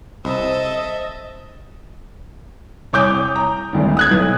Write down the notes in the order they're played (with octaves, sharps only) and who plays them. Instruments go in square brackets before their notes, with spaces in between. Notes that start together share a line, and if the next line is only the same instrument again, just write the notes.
[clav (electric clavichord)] C2 [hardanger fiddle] A4 E5 [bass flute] C5 [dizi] D#5
[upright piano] C2 C#5 G#5 D6 D#6 G6
A#5
G#1 D2 G2
D#6 F#6 G#6
B1 B4